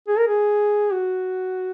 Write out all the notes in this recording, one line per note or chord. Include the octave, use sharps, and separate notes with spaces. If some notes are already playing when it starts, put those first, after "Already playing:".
G#4
A#4
G#4
F#4